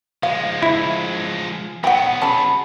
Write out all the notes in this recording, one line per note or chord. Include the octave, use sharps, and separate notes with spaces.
F3 G#3 F5
E4
F#3 B3 F#5 G5 B5
C#4 G#4 A5 B5